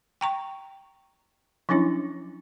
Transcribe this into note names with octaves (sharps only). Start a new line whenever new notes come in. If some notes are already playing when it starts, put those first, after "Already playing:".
G5 A#5 C#6
F3 F#3 C#4 D4 E4